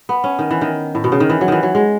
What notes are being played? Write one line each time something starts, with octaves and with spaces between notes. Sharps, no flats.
B3
C#4
D#3
E3
D#3
A2
B2
C#3
D#3
E3
F#3
D#3 E3
F#3
G#3